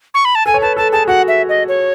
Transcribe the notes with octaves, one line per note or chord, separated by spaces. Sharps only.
C#6
B5
A5
A4 G#5
C#5
B4 A5
A4 A5
G#4 A5
F#4 F#5
E5
D#5
C#5